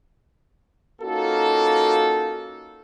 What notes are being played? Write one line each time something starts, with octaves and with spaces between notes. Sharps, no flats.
A#3 C#4 D#4 F4 F#4 A4